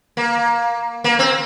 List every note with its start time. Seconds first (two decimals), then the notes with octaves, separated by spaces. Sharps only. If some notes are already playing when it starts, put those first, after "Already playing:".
0.17 A#3
1.04 A#3
1.19 C4